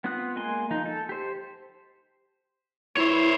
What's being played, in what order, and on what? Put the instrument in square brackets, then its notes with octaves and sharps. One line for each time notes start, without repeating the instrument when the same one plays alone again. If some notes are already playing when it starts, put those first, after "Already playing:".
[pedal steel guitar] B3 C4 F4 D#6 F#6
G#3 A#3 G#5 C6
F3 D#4
A4
G4 C5
[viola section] E4 [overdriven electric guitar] C5 C#5